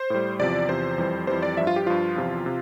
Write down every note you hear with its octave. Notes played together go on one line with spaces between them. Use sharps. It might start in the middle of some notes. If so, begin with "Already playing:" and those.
Already playing: C5
A2 G3
E2 C3 F3 D5
E2 C3 F3 C5
F2 E3 G3
F2 E3 G3 C5
D5
G2 F3 E5
F4
G4
G2 F3 F4
E2 C3 F3
C3